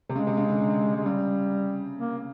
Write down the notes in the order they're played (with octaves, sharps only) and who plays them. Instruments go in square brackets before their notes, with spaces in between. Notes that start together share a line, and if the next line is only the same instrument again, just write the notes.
[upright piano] C3
[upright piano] C#3 [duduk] G#3
[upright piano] C3
C#3
D3
D3
[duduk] G#3
[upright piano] C#3 [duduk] G3
[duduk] A#3